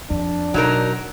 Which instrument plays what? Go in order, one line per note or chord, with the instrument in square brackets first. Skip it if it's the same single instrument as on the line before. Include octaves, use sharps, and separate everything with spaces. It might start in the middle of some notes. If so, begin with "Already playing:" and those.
[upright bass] F2 [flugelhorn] D4
[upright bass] B2 [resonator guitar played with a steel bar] F#3 D#4 A#4